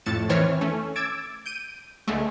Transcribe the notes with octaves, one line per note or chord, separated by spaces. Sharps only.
F2 A2 A6 C#7 E7
D#3 E3 C4 C#5 F6
A3 C#4
D6 E6 G#6 A6 D7
G6 D7 D#7
C#2 D3 G#3 A3